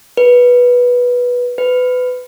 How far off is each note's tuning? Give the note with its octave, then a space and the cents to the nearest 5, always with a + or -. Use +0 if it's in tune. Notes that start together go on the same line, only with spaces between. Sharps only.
B4 -10
B4 +25